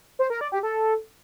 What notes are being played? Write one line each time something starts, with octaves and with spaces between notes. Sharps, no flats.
C5
A#4
D5
G4
A4